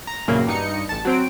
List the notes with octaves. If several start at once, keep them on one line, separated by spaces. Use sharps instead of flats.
A#5
E2 G2 A#2 C#3 F#3 A#3
G2 D#4 C#7
A1 A5
F#3 C4 D7